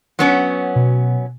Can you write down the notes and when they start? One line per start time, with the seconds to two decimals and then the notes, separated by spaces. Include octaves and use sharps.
0.19 F#3 B3 C#4
0.76 B2